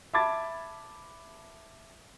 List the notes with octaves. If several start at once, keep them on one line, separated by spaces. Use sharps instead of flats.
E5 A5 B5 D6 G#6 A6